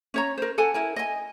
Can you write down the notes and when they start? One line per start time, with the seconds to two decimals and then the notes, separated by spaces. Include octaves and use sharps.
0.14 C#4 C#5 A#5
0.37 A#4 C5
0.58 A4 F#5 G#5 A5
0.74 E4 A#4 G#5
0.96 D#5 G#5